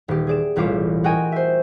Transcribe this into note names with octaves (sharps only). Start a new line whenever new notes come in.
D#1 G4
G#4 D5 E7
E1 A1 G3 F4 D6 E7
F#4 A#4 D#5 G5 G#5
C5 E5